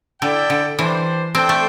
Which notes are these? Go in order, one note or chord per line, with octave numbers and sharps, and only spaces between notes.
D3 E4 A4 D5 G5
D3
E3 G3 D4 C5
C4 D4 A4 C5 G5
A3